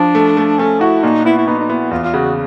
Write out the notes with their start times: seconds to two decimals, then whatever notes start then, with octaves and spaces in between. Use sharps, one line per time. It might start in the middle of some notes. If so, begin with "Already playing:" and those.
Already playing: F3 D4
0.15 A3
0.37 A3
0.59 A3 C#4
0.81 E4 F#4
1.03 A#2 D#4
1.25 B3 E4
1.38 E4
1.48 B3 D#4
1.59 D#4
1.69 B3 E4
1.91 E2 F4
2.04 F4
2.14 C#3 F#4